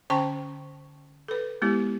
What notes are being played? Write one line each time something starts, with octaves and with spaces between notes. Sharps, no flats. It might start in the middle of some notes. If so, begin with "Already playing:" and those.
D3 C#4 C5 G5 A5 C#6
A4 B4
G#3 B3 E4 G4